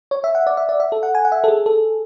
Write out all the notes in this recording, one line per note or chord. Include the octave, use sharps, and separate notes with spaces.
C#5
E5
F#5
D5
E5
D5
E5
A4
F#5
G#5
F#5
E5
A4
G#4
A4